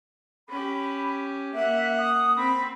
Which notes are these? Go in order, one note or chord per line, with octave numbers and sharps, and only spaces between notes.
C#4 G4 B5
A#3 E5 F#5
D#6
C4 B5